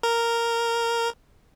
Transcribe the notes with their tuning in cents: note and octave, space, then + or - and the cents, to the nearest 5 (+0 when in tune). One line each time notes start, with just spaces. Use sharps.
A#4 -5